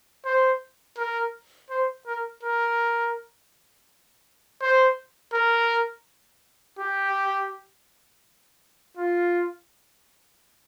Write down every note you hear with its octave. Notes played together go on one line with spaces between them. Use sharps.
C5
A#4
C5
A#4
A#4
C5
A#4
G4
F4